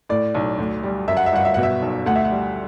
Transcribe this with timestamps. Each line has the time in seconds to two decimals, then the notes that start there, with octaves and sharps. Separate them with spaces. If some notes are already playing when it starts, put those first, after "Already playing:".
0.09 A2 D5
0.35 B1
0.58 D2
0.83 G3
1.08 F#2 E5
1.17 F#5
1.26 E5
1.33 G1 F#5
1.45 E5
1.54 B2 F#5
1.63 E5
1.82 B1
2.06 D2 F#5
2.15 E5
2.25 F#5
2.31 G3